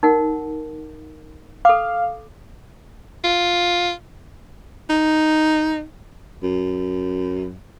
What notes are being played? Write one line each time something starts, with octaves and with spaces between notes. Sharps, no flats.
D#4 A#4 F#5
A4 F5 D6
F4
D#4
F#2